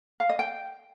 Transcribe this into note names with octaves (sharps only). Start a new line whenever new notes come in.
F5
D#5
G5